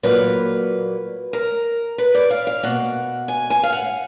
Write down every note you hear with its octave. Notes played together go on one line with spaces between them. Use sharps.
A#2 F#3 A#3 B4
A#4
B4
D5
F5
F5
B2 A#3 F#5
G#5
G#5
F5
F#5